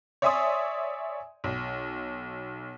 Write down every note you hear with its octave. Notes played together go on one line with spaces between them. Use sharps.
C#5 D5 E5 G#5 C6 D#6
B1